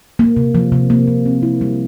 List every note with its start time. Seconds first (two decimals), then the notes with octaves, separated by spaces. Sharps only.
0.19 A#3
0.37 C3
0.55 F3
0.72 C3
0.90 A#3
1.08 C3
1.26 C4
1.43 E4
1.61 G3